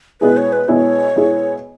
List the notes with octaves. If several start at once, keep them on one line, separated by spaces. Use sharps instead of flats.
B2 G#3 B3 E4 G#4 B4
C#5
B4
B2 G#3 B3 E4 G#4 C#5
B2 G#3 B3 E4 G#4